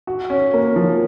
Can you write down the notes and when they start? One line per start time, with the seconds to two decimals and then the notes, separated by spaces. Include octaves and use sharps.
0.07 F#4
0.30 C#4
0.54 A#3
0.76 F3